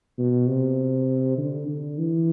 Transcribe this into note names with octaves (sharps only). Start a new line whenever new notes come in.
B2
C3
D3
D3
E3